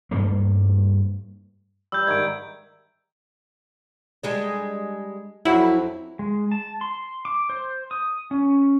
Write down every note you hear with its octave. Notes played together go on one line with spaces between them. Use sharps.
G2 G3 A3 A#3
G3 E6 G6
G#2 D#3 E5 G#6 D7
G3 G#3 D4
F2 F#3 E4 E5
G#3
A5
C6
D6
C5
D#6
C#4